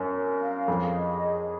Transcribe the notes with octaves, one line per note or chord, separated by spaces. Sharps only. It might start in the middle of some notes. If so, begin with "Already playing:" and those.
Already playing: F#2
A#4
F5
F2 G#4
D#5
G#4